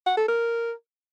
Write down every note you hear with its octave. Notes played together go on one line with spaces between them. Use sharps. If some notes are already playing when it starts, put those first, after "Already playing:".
F#5
A4
A#4